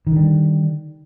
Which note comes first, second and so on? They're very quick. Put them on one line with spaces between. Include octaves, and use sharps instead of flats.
D#3 D3 G3